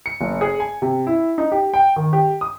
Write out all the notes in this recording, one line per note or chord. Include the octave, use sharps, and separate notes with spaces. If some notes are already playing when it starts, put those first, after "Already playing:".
C#7
F#1
G#4
G#5
C3
E4
D#4
G4
G5
D#3
G4
D#6